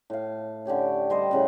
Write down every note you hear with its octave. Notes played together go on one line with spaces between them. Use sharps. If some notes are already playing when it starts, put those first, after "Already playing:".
A2 F5
D3 C#4 G4 C#5
G3 C5 D#5
A2 C#3 F#5